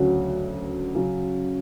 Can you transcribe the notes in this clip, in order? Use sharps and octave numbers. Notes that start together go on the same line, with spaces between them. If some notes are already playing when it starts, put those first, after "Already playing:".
Already playing: D2 C#3 F#3 C#4 F#4
C#3 F#3 C#4